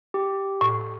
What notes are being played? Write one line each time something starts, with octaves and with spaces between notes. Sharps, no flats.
G4
A2